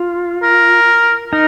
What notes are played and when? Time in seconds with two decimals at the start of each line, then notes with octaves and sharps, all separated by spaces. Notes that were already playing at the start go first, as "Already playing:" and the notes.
Already playing: F4
0.43 A#4
1.32 D#4 A#4